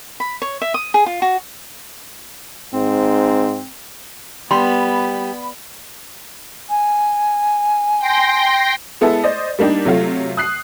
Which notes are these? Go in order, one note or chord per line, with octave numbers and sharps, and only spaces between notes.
B5
C#5
E5
D#6
G#4
F4
F#4
G#2 C4
G3 B3 B5 C6
G#5
G5 C6 A#6
G#3 B3 E4 A4
C5 D5 D#5
G3 A#3 D4 D#4 G4
C3 F#3 A3 F4
D#6 F#6 C7